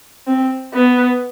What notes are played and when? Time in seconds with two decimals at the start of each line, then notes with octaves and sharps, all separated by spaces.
0.27 C4
0.74 B3